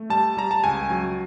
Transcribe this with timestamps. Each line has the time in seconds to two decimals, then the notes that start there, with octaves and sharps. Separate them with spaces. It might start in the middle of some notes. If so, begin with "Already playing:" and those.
Already playing: A3
0.10 G3 A5
0.37 G3 A#5
0.51 A5
0.63 C#2 G#5
0.90 F#3